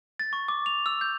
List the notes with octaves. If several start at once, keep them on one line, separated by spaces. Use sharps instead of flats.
A6
C#6
D6
F7
E6
G6